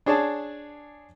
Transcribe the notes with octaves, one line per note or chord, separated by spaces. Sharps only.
D4 G#4 C#5 D5 A5